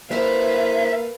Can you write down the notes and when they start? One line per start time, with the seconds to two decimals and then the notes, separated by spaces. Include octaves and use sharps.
0.11 A#3 E4 A4 B4 C5 E5 F5